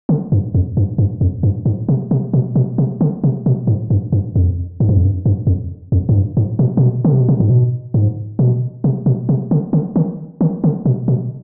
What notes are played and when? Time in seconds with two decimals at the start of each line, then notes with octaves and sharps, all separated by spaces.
0.09 D3
0.32 G2
0.55 F2
0.77 G2
0.98 G2
1.21 F2
1.43 G2
1.66 G#2
1.89 C3
2.11 C3
2.33 B2
2.56 B2
2.78 C3
3.01 D3
3.24 C3
3.46 B2
3.67 G#2
3.90 G2
4.12 G2
4.36 F2
4.80 G#2
4.89 G2
4.97 F2
5.05 G2
5.26 G2
5.47 F2
5.92 F2
6.09 G#2
6.15 G2
6.37 G#2
6.59 B2
6.77 C3
6.82 B2
7.05 D3
7.12 C3
7.21 B2
7.29 C3
7.40 G#2
7.50 B2
7.94 G#2
8.39 B2
8.84 C3
9.06 B2
9.29 C3
9.51 D3
9.73 D3
9.96 D#3
10.41 D#3
10.64 D3
10.86 B2
11.08 B2